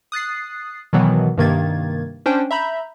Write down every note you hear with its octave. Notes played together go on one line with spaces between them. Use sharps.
D#6 F#6 A6 C7
B2 D#3 E3 F#3 B3
G2 C3 D#3 A#3 G#6 A6
C#4 D4 C5 G5
E5 A#5 B5 G6